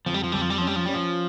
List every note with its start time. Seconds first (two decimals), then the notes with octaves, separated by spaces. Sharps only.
0.06 F2 F3
0.14 G3
0.24 F3
0.32 F2 G3
0.42 F3
0.50 G3
0.58 F3 C#4
0.67 G3
0.76 F3
0.86 G3 C#4
0.94 F3